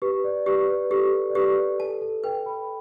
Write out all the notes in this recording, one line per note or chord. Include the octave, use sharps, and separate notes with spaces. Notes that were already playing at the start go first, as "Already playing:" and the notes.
G4 B4
D5
G4 B4
B4
G4 A4
D5
G4 B4
A4 A5
A4
B4 G5
B5